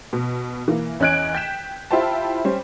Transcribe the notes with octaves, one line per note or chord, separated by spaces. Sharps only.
B2
E3 A#3
E2 C#4 D#5 F#6 G#6 D7
G5 G6 B6 E7
E4 F4 G4 C5 G5 A5
G3 C#4 C5